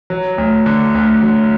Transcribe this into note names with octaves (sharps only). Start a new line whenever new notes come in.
F#3
D2
D3
D2
F#3